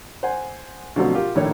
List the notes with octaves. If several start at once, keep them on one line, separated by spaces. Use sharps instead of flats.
C5 F#5 G#5
B2 D3 F3 F#3 A3 C4
F4 G4 A#4
A#1 D#2 A2 C#5